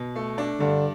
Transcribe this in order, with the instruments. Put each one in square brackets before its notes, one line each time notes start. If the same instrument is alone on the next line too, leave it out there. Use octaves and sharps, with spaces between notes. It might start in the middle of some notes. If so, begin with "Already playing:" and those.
Already playing: [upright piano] B2
A3
D4
[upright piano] G2 [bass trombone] D3